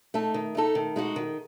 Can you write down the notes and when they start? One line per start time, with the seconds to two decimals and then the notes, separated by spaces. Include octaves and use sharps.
0.14 A3 D#4 A4
0.34 D#3
0.55 A3 D#4 A4
0.75 D#3
0.96 G#3 D#4 F#4
1.16 D#3